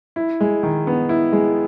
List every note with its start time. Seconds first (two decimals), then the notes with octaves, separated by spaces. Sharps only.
0.16 E4
0.41 G#3
0.63 D#3
0.87 B3
1.09 E4
1.33 G#3